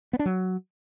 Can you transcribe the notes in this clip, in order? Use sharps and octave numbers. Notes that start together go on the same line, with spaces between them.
B3
D4
F#3